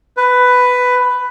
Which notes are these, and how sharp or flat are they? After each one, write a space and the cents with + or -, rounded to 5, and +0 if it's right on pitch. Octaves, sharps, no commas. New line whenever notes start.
B4 +10